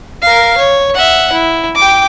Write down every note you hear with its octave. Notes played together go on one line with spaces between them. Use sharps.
A#4 F5
C#5
E5 F#5
E4
G5 D6